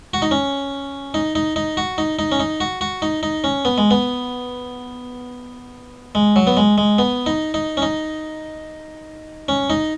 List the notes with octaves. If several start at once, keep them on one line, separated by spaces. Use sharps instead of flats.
F#4
D#4
C#4
D#4
D#4
D#4
F#4
D#4
D#4
C#4
D#4
F#4
F#4
D#4
D#4
C#4
B3
G#3
B3
G#3
F#3
B3
G#3
G#3
B3
D#4
D#4
C#4
D#4
C#4
D#4